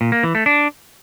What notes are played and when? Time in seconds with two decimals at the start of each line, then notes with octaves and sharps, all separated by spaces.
0.01 A#2
0.12 A#3
0.23 E3
0.35 A3
0.46 D4